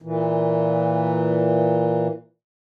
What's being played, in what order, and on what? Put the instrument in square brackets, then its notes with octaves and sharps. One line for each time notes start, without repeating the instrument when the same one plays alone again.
[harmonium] A#2 E3